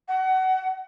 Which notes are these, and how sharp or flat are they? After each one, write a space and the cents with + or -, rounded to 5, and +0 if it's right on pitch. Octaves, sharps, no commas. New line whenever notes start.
F#5 +25